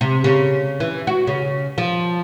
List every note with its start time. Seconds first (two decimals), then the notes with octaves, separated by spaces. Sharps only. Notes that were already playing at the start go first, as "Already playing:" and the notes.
0.01 C3
0.24 C#3
0.80 E3
1.07 F#4
1.27 C#3
1.78 F3